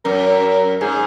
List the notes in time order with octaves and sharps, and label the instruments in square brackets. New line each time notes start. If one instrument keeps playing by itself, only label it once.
[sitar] F#2 [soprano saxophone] A#4
[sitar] G#2 [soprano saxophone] G#4